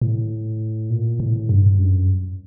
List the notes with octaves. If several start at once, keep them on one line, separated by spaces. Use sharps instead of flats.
A2
A#2
A2
G2
F#2